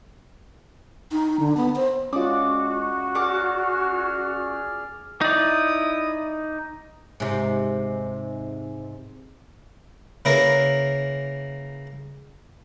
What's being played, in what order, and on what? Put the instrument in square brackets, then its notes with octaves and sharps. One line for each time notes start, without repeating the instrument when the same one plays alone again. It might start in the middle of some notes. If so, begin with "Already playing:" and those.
[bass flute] D#4
D3
B3
C5
[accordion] G#3 [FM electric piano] C#4 F4 [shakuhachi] F#4 [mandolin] D5 D6 D#6
[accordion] G#4 D5 F6 [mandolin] A#4 F#5 D6
[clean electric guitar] D#4 D5 [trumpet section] E4 D#6
[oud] G#2 C3
[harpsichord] C#3 A#3 E4 G#4 A#4 B4